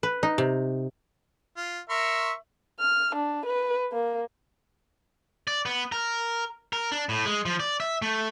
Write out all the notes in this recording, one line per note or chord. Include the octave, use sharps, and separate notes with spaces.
B4
D#4
C3
F4
A#4 E5 C6 C#6
F6
D4
B4
A#3
D5
B3
A#4
A#4
D4
A2
G#3
F3
D5
E5
A3